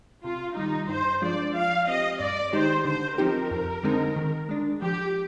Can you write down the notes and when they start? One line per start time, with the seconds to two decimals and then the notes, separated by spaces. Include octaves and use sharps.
0.24 C3 F4
0.57 D#3 G3 D#4
0.89 G2 C5
1.22 F3 G#3 D4 F4 D5
1.54 F3 F5
1.87 C4 G4 D#5
2.20 G2 D5
2.53 D#3 G#3 D#4 G4 C5
2.85 D3 C5
3.18 F3 C4 D#4 G4 A#4
3.51 F2
3.83 D3 G#3 C4 D#4
4.16 D#3
4.49 G#3 D4
4.81 F3 G4